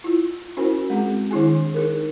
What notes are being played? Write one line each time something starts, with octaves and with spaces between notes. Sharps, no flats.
E4 F4
C#4 E4 F#4 A#4 C5 G#5
G#3 C4 G#4
D#3 D4 E4 G#4 G#5
D#4 G#4 A#4